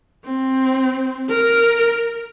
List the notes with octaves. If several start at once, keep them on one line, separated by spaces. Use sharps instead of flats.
C4
A#4